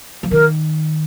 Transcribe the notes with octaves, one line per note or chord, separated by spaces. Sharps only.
F3
D#3 A#4